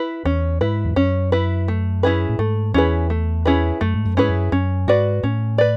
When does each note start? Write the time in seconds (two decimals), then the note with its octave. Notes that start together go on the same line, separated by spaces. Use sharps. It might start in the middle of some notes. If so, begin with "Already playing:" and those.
Already playing: E4 B4
0.25 E2 C#4
0.60 G#2 E4 B4
0.85 E2
0.96 F#2 C#4
1.32 E4 B4
1.68 A3
2.03 C#4 E4 G#4 B4
2.29 A2
2.39 G#2 A3
2.74 E2 C#4 E4 G#4 B4
3.10 A3
3.46 C#4 E4 G#4 B4
3.81 F#2 A3
3.94 G#2
4.05 F#2
4.17 G#2 C#4 E4 G#4 B4
4.29 F#2
4.52 F#2 C#4
4.87 G#2 F#4 B4 D5
5.23 A2 C#4
5.58 B4 D5